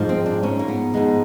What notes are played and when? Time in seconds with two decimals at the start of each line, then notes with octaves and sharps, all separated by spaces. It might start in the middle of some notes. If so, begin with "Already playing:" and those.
Already playing: G#2 F3 G#3
0.09 C4
0.26 D4
0.43 G#2 F3 G#3 C#4
0.59 A#3
0.68 B3
0.94 G#2 F3 G#3 B3